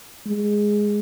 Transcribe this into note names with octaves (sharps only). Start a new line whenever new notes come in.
G#3